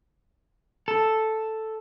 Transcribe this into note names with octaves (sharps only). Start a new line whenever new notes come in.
A4